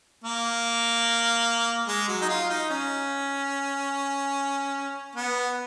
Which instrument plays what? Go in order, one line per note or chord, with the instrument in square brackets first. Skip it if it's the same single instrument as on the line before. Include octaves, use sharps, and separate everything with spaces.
[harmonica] A#3
G#3
F#3
D#4
F4
D#4
C#4
B3